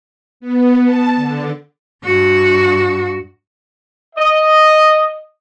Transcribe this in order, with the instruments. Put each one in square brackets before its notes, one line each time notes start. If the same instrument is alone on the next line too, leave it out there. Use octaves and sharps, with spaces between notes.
[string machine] B3
A5
D3
[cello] G2 F#4
[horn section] D#5